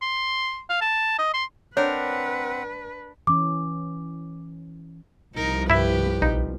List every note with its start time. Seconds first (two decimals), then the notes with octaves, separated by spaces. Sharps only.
0.02 C6
0.70 F5
0.82 A5
1.19 D#5
1.34 C6
1.77 C4 D4 A#4 B4 C#5 F#5
3.27 E3 C#4 D6
5.35 C2 F3 D#4 A#4
5.70 G2 E4 G4 B4 E5
6.22 A#1 D#4